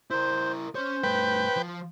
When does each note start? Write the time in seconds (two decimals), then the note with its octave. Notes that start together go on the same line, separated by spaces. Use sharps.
0.11 E4 A#4 C5
0.75 C#4 C5 C#5
1.03 G2 A3 B4 G5
1.57 F3